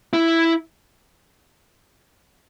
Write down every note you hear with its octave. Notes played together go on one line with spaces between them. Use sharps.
E4